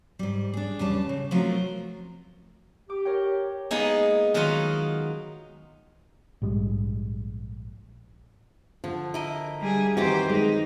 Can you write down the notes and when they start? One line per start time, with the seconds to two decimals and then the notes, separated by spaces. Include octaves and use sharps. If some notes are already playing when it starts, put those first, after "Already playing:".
0.19 G#2 G3
0.53 D4 G#4
0.79 E2 C#3 G3 A5
1.09 C#3
1.31 C3 F3 F#3 A3 F4 A#4
2.90 G4 D6
3.05 A#4 C#5 G5
3.71 G#3 A#3 B3 D#4 G#4
4.34 D#3 F#3 G#3 B3 D#4 F4
6.42 A#1 G#2 G3 G#3
8.84 D3 F3
9.14 E4 A#4 D#5
9.61 G3 G#4
9.97 D#3 E3 C4 F#4 G4 C5
10.30 G#3 D#4